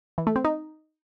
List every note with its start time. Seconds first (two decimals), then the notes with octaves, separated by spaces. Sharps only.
0.18 E3
0.27 A3
0.36 C4
0.44 D#4